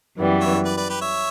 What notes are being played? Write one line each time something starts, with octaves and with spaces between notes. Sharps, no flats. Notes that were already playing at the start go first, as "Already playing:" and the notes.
F#2 E3 G3 B3
C#5 E5
B4 D5
B4 D5
G4 B4
C#5 E5